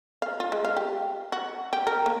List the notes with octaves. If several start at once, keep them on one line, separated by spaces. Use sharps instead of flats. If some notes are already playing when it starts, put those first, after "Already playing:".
F5
F4
G#3
F5
G4
F#4
G4
A#4
A#3